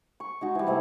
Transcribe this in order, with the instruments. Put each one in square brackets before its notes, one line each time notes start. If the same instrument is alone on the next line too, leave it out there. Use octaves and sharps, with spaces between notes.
[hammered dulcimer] C#6
G#3 D#4 F#4
E3 G3
C3 A3 C4 E4